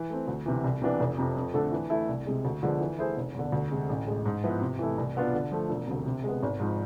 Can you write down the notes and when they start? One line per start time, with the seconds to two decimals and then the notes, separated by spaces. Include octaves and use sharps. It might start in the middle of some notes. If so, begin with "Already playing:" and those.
Already playing: E3
0.10 A3 C4
0.28 D2
0.46 C3 E3
0.64 C2
0.82 C3 E3 B3 D4
1.00 F1
1.18 F2 C3
1.37 F2
1.54 D3 A3 D4 A4
1.72 E3
1.90 A3 E4 A4 E5
2.08 C2
2.26 C3 G#3
2.45 D2
2.63 D3 F3 G#3 B3
2.80 E3
2.99 A3 E4 G#4 C5
3.17 F1
3.34 E2 D3
3.52 D2
3.71 C3 G#3
3.89 A1
4.07 A2 G#3
4.26 G#2
4.44 F3 B3 E4 B4
4.61 C3
4.79 E3 A3 E4
4.98 C2
5.15 B2 B3 D4 F4
5.34 D3
5.51 F3 A3
5.69 E1
5.88 D2 C3
6.06 C3
6.24 G#3 B3
6.43 G#1
6.60 G#2 F3